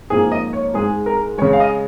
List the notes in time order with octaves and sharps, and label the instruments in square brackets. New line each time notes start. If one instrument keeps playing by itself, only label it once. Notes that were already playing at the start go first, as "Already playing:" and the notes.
[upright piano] G#2 F3 A#3 G#4
D#5
C#5
G#2 G#3 G#4
A#4
G#3 C#5
C#3
F5
D#5